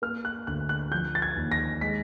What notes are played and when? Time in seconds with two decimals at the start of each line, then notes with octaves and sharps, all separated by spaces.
0.02 A#3 F6
0.25 F#6
0.47 D2 F#6
0.69 F#6
0.91 F3 G6
1.15 A6
1.22 G#6
1.36 D#2
1.52 A#6
1.81 G#3 B6